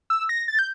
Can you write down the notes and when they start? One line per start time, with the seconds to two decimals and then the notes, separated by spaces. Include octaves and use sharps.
0.10 E6
0.29 A#6
0.48 A6
0.59 G6